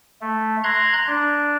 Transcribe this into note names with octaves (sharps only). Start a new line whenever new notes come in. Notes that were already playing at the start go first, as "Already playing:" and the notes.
A3
A#5 C6 F#6 G#6
D4